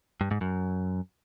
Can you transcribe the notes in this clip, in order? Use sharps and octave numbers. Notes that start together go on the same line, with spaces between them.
G2
G#2
F#2